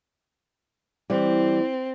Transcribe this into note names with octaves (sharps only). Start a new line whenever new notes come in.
E3 G3 C4